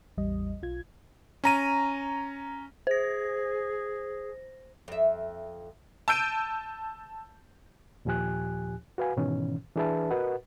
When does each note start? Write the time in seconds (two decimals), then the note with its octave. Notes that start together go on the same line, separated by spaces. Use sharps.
0.17 A1 E2 G3 D#5
0.62 B1 F4 G#6
1.44 C#4 A#5 D#7
2.87 G#4 C5 A#6
4.88 F2 E5
6.08 A5 E6 G6 D7 D#7
8.05 D#2 A#2 F3 G4 G#5 F#6
8.98 F#4 B4 F5 G#5
9.17 G#2 B2 D#3 E3 C#4
9.76 E3 D4 G#4 B4 E5 A5
10.11 F#4 A#4 B4 D#5 F#5